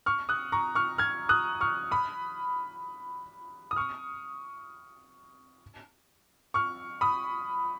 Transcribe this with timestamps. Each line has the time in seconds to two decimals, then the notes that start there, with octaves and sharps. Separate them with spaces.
0.06 C#6 F6
0.29 D#6 F#6
0.52 A#5 C#6
0.75 C#6 F6
0.98 F6 G#6
1.29 D#6 F#6
1.61 C#6 F6
1.91 B5 D#6
3.71 D#6
3.76 C#6 F6
6.54 C#6 F6
7.01 B5 D#6